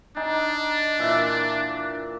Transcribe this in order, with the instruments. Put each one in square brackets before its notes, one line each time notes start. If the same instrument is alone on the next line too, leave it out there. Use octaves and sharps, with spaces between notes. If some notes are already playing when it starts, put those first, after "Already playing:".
[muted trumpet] D4 [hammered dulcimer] D#4 G#5
[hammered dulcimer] A#2 E3 E5